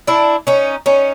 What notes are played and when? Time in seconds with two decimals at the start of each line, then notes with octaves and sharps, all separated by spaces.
0.07 D4 E4
0.47 C#4 D#4
0.86 C#4 D#4